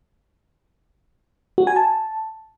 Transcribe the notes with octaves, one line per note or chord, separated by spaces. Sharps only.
F#4
G#5
A5